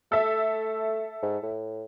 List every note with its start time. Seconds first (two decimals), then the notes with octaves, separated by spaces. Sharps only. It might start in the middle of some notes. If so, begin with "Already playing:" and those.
0.12 A3 A4 E5
1.23 G#2
1.43 A2